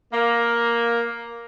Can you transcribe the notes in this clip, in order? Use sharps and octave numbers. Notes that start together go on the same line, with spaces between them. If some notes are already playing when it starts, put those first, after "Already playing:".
A#3